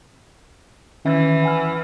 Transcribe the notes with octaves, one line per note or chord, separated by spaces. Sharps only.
D#3 E3 C#4 E5
F#5 G#5 F6